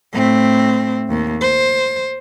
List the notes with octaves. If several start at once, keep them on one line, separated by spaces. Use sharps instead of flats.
A2 C4
D#2
C5